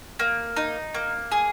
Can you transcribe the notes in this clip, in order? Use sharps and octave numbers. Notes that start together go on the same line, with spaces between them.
A#3
D#4
A#3
G#4